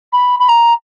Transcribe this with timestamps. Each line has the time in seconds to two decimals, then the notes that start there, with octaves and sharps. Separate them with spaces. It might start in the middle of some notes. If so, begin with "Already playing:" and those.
0.13 B5
0.39 B5
0.48 A#5